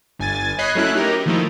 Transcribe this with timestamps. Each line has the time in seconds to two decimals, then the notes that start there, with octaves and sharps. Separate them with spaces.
0.19 G1 G#5 A6
0.58 C#5 D#5 B5 F#6 G#6 C7
0.75 F#3 A3 C#4 E4 F#6
0.95 D#4 G4 A#4
1.26 D#3 F3 A3 D#4 E4